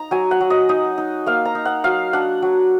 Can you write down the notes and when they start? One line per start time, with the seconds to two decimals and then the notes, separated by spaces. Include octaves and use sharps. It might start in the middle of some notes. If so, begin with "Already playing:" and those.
Already playing: D#4 A#5
0.11 F#3 G#5
0.31 F#5
0.41 F#3
0.50 D#5
0.69 D#4 D#5
0.98 D#4
1.26 A#3 F5
1.45 A#5
1.55 D#4
1.65 F#5
1.84 F#3 F5
2.13 D4 F#5
2.42 F#3